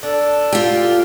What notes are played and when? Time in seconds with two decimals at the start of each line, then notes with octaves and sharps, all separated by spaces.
0.03 D4 A4
0.53 F4 G4